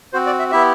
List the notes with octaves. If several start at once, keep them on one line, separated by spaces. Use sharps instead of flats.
C4 F#4 C5
D5
E5
B3 E4 G4 E5